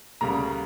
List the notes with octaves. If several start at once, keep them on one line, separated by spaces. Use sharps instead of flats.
D2 C#3 G3 A#3 A#5